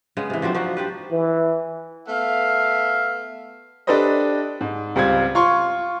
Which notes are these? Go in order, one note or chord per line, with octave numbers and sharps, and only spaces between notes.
C#3 G#3 B3
C3 E3
F3 F#3 C4 D4
F3 C4 D#4 F#4
D4 G4 B4
E3
A3 B3 E5 F5
D4 G4 A4 B4 C5 D#5
G#2
C#2 G3 C4 F5 G#6
F4 C6 C#6